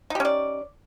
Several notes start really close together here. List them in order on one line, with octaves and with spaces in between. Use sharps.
D#4 G4 C#4 D5